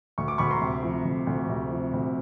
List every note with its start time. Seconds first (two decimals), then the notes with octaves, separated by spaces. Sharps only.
0.18 D2 C#6
0.28 D6
0.38 D2 B5 C#6
0.51 A#5 C6
0.61 C3
0.83 F3
1.05 D2
1.27 D2
1.49 C3
1.71 F3
1.93 D2